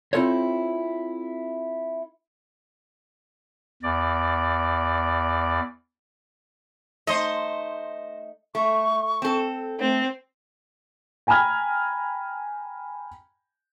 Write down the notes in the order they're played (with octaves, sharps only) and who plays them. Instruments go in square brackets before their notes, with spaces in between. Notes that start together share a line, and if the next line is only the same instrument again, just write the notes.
[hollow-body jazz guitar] C4 E4 F4 A4 C5 C#5
[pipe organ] E2 D5
[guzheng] A3 D#4 [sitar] C5 D#5
[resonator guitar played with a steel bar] A3 [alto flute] C#6
[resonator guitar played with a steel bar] C4 A4
[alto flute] A3 [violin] C4
[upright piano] G5 G#5 A#5 B5 F6 G#6